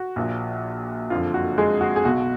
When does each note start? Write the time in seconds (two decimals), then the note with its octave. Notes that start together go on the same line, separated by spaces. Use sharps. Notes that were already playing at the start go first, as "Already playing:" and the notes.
Already playing: F#4
0.16 A#1 A#2 F3
1.10 F#1 F2 D3 F3 F4
1.34 F#4
1.58 G#3 G#4
1.81 F#4
1.96 G#4
2.04 B1 B2 F#4